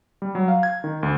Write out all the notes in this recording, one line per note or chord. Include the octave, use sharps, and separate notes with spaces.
G3
F#3
F5
G#6
D#3
D2